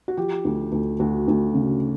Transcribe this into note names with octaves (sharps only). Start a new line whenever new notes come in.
F#4
F3 G4
D2
D2
D2 F#4
D2
C#3